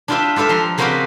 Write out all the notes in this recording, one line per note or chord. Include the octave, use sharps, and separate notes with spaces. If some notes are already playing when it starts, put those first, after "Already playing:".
D4 E4 F4 G4 B4 E5
F4 G4 A4 B4 E5
F3 A#5 C6
C#3 A#3 C4 F#4 G4 B4